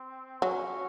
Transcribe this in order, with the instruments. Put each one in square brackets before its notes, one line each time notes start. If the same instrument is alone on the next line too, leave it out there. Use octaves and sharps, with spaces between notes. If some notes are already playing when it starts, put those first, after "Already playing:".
Already playing: [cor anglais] C4
[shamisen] F#3 [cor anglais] C#4